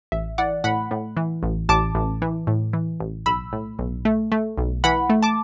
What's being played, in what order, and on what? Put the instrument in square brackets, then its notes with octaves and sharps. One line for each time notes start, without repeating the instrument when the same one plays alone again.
[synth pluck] A1 E5
E3 D5 F#5
A2 F#5 B5
A2
E3
A1
A1 A5 D6
A1
E3
A2
E3
A1
B1 B5 E6
A2
B1
A3
A3
B1
E3 F#5 B5
A3
A5 D6